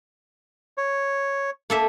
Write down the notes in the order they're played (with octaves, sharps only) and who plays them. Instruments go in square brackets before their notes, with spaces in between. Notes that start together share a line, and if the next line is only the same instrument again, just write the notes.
[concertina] C#5
[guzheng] A#3 A4 E5